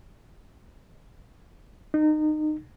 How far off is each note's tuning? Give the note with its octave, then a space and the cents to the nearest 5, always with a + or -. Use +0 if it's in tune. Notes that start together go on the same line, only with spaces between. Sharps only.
D#4 -25